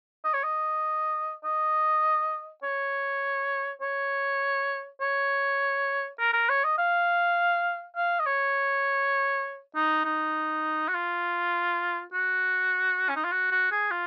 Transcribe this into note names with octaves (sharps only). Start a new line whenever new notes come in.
D#5
C#5
D#5
D#5
C#5
C#5
C#5
A#4
A#4
C#5
D#5
F5
F5
D#5
C#5
D#4
D#4
F#4
F4
F#4
C#4
D#4
F4
F#4
F#4
G#4
F4